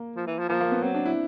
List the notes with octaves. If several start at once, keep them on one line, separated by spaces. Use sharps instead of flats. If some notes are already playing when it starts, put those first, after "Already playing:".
Already playing: A#3
F3
E3
F3
F3 A#3
A#3
B3
F#3 C4
D4
E4